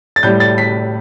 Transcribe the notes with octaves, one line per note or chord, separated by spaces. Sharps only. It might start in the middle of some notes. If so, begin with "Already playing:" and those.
A6
A2 G3 G6
A6
B6